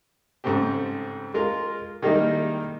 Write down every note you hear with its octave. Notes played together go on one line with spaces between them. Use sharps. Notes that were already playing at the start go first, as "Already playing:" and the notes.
G#2 C#3 A3 C4 G4
G#3 F4 A#4
D#3 G3 G#3 A#3 D#4 E4